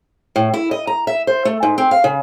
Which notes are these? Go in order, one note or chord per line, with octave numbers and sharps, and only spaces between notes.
A2
E4
D#5
A#5
E5
C5
A3
G#2
C4
F5
C#3